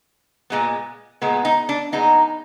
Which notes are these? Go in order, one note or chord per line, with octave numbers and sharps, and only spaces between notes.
A#2 G#3 B3
A#2 G#3 B3
D#4
D4
A#2 G#3 B3 D#4